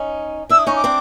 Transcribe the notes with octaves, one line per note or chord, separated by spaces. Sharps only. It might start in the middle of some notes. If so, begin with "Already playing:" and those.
Already playing: C#4 D#4
D4 E4 E6
D#6
C#4 D#4 C#6
D6
C4 D4